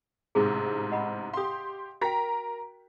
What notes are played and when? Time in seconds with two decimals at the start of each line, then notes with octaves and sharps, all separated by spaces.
0.35 A1 G#2 C3 G#4
0.92 D#5 F#5 B5
1.33 G4 F5 C6 D#6
2.01 F#4 A#4 G5 A#5 B6